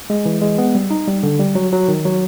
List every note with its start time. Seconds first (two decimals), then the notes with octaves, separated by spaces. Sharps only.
0.10 G#3
0.26 E3
0.42 G#3
0.58 B3
0.75 G3
0.90 D#4
1.08 G3
1.23 D3
1.40 G3
1.55 F#3
1.72 F#3
1.88 D#3
2.05 F#3